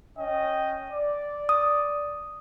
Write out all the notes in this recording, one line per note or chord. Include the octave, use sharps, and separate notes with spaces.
C#4 D#5 G5
D5
D#6